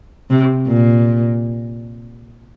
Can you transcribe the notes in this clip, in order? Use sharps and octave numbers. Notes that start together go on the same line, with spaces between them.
C3
A#2